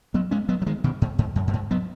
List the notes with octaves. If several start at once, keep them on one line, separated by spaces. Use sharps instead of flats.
F#3 B3
G#3 C#4
F#3 B3
F#3
D#3 G#3
B2 D#3
G#2
G#2
F#2
F#2
G#2
F#3 B3